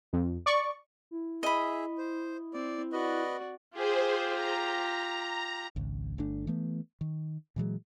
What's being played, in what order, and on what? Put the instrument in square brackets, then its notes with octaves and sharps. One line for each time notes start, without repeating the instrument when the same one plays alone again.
[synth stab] F2
D5 C#6
[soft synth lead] E4
[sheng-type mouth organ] G#4 E5 [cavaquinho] D#5 B5
[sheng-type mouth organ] C5
[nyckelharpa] C4 [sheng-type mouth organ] D5
[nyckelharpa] F#4 D5 [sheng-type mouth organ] B4 D#5
[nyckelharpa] F4 G4 [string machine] G#4 C5
[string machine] A#5
[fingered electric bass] G#1 C#2
G1 A3 D4
E3 A3 B3
D#3
A#2 E3 F#3 G#3